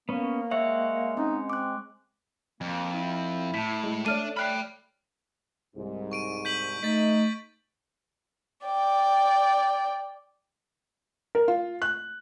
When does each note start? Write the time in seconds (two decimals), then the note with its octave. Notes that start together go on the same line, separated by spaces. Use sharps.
0.09 A#3 B3 C#4
0.51 G#3 C#5 E5 F#5
1.17 C4 C#4 D#4
1.50 C4 D6 F#6
2.61 F2 A#3
2.93 E4
3.54 A2 A5 B6
3.83 G#3
4.06 A3 D4 C#5 D5 F6 D#7
4.37 G5 B5 F6 F#6 C7
5.76 C2 G#2
6.12 C#6 D7 D#7
6.45 G6 B6 F#7
6.83 A3 D#4 D#5 A6 B6
8.65 D5 G5
11.35 A#4
11.48 F4
11.82 F#6